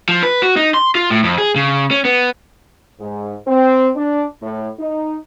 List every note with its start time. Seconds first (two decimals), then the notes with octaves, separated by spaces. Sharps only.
0.09 F3
0.23 B4
0.42 F#4
0.57 D#4
0.74 C6
0.95 F4
1.10 A2
1.24 F2
1.38 G#4
1.56 C#3
1.91 C#4
2.05 B3
3.00 G#2
3.47 C4
3.96 D4
4.41 A2
4.79 D#4